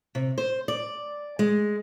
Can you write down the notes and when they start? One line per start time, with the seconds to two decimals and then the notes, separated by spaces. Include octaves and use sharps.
0.15 C3
0.38 C5
0.68 D5
1.39 G#3